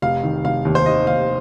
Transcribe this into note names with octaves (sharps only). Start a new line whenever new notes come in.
F1 F5
D#3
F1 F5
D#2
C5
D#3 D#5
D#2 F5